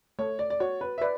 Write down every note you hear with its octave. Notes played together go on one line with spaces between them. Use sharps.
A3 C#5
D5
D5
F#4 C#5
B4
E5
B4 D5